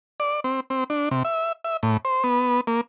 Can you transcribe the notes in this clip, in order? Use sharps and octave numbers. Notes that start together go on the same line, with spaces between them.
D5
C4
C4
D4
C3
E5
E5
A2
C5
B3
A#3